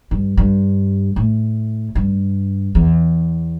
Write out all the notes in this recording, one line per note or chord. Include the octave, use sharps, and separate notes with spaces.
G2
G2
A2
G2
E2